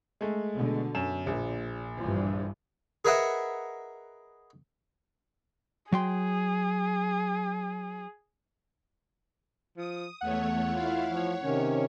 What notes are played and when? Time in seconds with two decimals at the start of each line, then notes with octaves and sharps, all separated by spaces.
0.21 G#3 A3
0.53 B2 D3
0.95 F#2 E7
1.26 A#1 A#2
1.98 G2 E3 F3
3.05 G#4 A#4 B4 D#5 E5 F#5
5.92 F#3 G#4 G5 C6
9.77 F3 D#6
10.22 E2 A3 C#5 F#5
10.73 E4 F4 F5
11.09 F3 C#5
11.43 C3 D#3 C#4